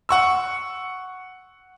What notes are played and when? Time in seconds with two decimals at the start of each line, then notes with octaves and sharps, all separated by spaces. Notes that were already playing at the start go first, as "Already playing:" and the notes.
0.09 F#5 C#6 E6